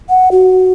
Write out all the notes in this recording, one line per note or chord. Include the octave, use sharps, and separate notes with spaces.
F#5
F#4